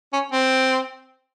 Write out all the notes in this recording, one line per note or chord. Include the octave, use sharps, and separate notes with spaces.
C#4
C4